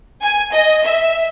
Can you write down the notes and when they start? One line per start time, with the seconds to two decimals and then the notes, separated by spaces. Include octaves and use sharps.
0.22 G#5
0.53 D#5
0.83 E5